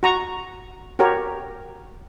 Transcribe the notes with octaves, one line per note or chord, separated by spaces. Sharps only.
F#4 A#5 C#6
F#4 G4 A#4 C#5